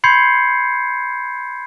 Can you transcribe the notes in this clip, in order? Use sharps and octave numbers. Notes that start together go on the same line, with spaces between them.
B5 C6 G6 G#6 C7 C#7